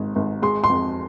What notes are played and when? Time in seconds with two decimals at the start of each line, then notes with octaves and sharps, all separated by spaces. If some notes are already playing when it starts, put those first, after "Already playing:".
Already playing: G#1 G#2
0.16 G#1
0.42 G#3 C6
0.64 C6
0.69 F2